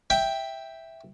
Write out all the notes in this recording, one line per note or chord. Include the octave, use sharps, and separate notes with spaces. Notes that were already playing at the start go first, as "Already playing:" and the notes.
E5 G5